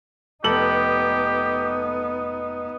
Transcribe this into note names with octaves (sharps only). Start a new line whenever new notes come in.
F1 B3 D#4 G4 A4 F#7